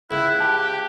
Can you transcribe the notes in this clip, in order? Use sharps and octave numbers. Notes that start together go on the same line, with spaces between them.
C#2 E4 F#6
G4 A5